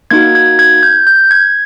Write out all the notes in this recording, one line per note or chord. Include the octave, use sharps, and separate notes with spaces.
A#3 D#4 F#4 G#6
G#6
G#6
G6
G6
G#6